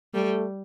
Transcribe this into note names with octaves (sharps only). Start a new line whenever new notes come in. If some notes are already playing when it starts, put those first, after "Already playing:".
G3 A3